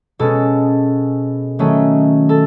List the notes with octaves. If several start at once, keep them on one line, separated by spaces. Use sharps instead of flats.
B2 G#3 C#4 A4
D#3 F#3 A3 C#4
A4